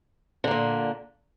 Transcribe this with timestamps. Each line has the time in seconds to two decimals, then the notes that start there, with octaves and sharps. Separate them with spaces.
0.44 D3
0.48 A#3
0.51 A#2